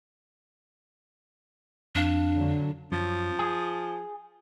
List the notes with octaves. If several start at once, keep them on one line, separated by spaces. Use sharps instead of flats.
F2 D4 F5
D3 F#3
F#2 F3
G#4